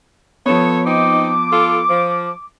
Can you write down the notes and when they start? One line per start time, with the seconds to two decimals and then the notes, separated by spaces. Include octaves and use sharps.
0.46 F3 B3 A4 C#5
0.85 C4 D#4 D6
1.51 F4 A4
1.89 F3